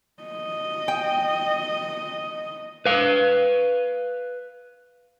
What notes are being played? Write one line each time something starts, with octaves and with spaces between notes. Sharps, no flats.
D#5
G5
B4 F5